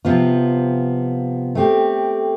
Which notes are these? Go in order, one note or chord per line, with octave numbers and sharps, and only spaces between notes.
C3 F3 B3 F4
A3 C4 G4